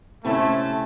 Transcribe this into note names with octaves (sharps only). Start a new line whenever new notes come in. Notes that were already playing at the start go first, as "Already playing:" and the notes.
C3 A3 C4 C#4 E4 A5